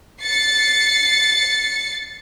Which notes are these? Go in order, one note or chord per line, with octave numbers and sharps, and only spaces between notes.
A6 C7 C#7